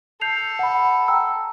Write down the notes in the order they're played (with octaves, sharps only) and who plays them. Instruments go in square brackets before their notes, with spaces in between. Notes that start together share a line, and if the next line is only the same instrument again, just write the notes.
[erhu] A4 [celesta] G6 C7 F7
[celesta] F#5 B5
G5 A#5 E6